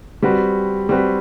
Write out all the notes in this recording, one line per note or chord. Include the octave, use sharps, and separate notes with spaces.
G3 C4 F#4 B4
G3 C4 F#4 B4